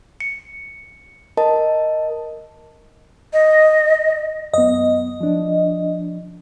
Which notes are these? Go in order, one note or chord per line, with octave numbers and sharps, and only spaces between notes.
C#7
A#4 D#5 A5
D#5
F#2 B3 D#5
F3 D4